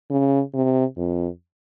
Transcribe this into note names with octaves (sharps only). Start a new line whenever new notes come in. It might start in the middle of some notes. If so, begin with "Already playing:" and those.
C#3
C3
F2